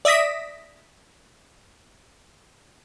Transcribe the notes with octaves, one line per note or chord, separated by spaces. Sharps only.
D5 E5 D#6 A#6 B6